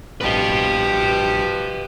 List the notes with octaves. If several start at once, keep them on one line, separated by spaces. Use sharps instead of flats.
A1 G2 F3 G4 B4 D#5